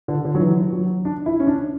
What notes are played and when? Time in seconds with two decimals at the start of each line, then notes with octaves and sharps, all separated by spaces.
0.08 D3
0.25 D3
0.35 F#3
0.40 E3
0.72 F#3
1.05 D4
1.26 E4
1.40 C#4
1.47 D4